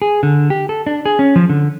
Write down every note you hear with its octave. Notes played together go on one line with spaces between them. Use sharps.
G#4
D3
G4
A4
D4
G#4
C#4
F3
D3